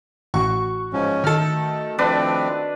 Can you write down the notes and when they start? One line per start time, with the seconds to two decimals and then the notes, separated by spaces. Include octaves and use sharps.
0.34 A1 F#4 C#6
0.93 G#2 F3 C#4
1.24 D#3 A4 F6
1.39 A3
1.99 F3 A3 C4 D4 B4 D5